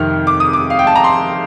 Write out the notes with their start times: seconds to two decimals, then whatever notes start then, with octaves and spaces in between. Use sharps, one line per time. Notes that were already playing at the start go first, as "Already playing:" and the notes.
Already playing: F2 C3 D#3 F6
0.27 D6
0.40 D#6
0.53 D6
0.70 F5
0.79 G5
0.87 A5
0.96 A#5
1.04 C6